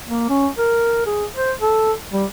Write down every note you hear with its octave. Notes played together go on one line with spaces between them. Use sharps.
A#3
C#4
A#4
G#4
C5
A4
G3